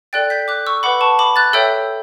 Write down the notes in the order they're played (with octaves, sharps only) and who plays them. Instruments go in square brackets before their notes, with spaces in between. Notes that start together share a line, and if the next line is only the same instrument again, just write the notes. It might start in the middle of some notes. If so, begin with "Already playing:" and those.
[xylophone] A4 D5 G5 F#6 A6
G6 B6
D6 F#6
C#6 E6
B4 F#5 B5 D6
A5 C#6
B5 D6
F#6 A6
A4 C#5 E5 G5 E6 G6